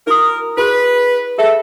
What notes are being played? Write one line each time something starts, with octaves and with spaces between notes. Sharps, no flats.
E4 F#4 A#4 D#6
E4 F#4 G#4 B4
G#4 A4 E5